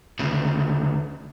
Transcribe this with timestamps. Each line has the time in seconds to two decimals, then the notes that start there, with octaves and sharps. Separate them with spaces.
0.19 D2 C#3